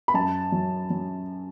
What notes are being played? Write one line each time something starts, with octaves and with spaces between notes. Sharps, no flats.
B5
F#2 A5
F#3
F#3